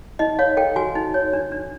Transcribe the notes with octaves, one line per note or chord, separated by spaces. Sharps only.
D#4 D#5
C#5 F5
A4 G5
F#4 G#5
D#4
C#5
D4
D4